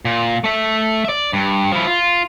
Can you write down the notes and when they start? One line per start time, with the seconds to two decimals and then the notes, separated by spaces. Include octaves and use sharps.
0.05 A#2
0.44 A3 E5
1.05 D5 E5
1.33 G2
1.72 F3 E4
1.87 F4